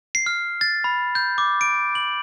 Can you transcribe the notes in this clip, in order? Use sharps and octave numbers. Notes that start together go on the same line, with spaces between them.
C7
F6
A6
B5
G6
D6
D7
F#7